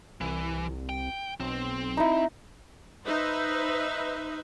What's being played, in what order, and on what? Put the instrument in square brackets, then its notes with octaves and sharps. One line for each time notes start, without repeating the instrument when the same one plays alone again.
[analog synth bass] C2 [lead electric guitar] E3
[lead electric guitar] G5
[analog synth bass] B1 [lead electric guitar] C4
[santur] D#4 E4
[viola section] D#4 B4 C5 E5